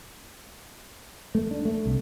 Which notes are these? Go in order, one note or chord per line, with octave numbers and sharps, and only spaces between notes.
A3
D4
A3
C2